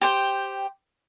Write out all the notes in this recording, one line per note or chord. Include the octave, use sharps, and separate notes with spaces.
G4 C5 G5